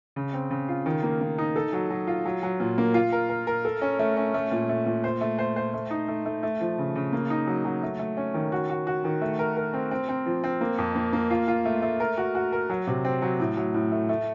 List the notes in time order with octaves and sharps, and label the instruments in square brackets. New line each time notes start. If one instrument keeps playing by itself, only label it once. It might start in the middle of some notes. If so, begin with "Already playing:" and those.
[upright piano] C#3
C4
C#3
F4
D#3
A#3
A#3
D#4
A4
F#3
F#3
F4
F#3
F#3
A#2
A#3
F4
A#4
A#4
A#4
A4
C#4
A3
C#4
A3
A#2
A3
A#2
C5
A3
C5
C5
A3
D#4
A3
A3
A3
F3
C#3
C#3
A#3
D#4
F#3
F#3
A3
A3
C#4
D#3
F#4
F#4
F#4
D#3
A3
A#4
A#4
C4
C4
C4
F3
C4
A#3
F2
A#3
A#3
F4
F4
A3
A3
A#4
F#4
F#4
A#4
F#3
C3
C4
F#3
A2
F#3
A2
A3
A3